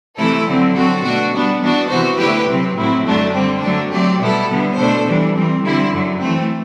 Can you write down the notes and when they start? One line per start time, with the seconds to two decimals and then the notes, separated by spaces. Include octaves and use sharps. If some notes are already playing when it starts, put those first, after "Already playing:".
0.18 C3 E3 A3 E4 A4
0.47 D3 F#3 C4
0.75 F#3 C4 F#4 A4
1.04 B2 A3 D4 F#4
1.33 G3 B3 D4
1.61 E3 B3 D4 F#4
1.90 C3 E3 B3 F#4 C5
2.18 D3 A3 E4 G4 B4
2.48 C3 F#3 C4
2.76 A2 F#3 C4 E4
3.05 F#2 D3 F#3 A3 D4
3.33 D3 G3 C4
3.62 D3 F#3 A3 D4
3.91 F#3 A3 C4 G4 D5
4.20 B2 G3 B3 E4 A4
4.49 D3 G3 B3
4.77 B2 A3 D4 A4 C5
5.06 E3 G3 D4
5.34 E3 G3 C4
5.63 D3 G3 C4 E4
5.92 F#2 D3 F#3
6.20 E3 A3 C4